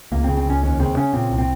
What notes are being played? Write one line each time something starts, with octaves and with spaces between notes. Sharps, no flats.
C#2 A#3
C4
C#3
C4
C#2 C#4
D#2 C#4
C#3 C4
C#3 C#4
A#2 C4
C2
C4